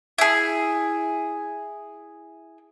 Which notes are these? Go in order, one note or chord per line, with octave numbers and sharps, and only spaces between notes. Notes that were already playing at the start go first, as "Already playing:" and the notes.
E4 G#4